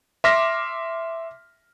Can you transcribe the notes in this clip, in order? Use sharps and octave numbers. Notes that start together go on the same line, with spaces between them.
E5 C6 D6 F6 A#6 B6